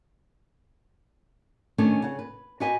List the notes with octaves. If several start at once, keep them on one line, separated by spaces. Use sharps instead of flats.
D#3 A3 C#4 D4 G#5
C#3 F#5
B4
F#4 G4 B4 D#5 F5 G#5